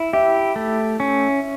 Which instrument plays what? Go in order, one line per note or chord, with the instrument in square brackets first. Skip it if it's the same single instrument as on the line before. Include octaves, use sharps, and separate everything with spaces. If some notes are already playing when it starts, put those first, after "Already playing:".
Already playing: [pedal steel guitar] E4 [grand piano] E5
[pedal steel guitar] G4 [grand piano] E5
[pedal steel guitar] A3
C#4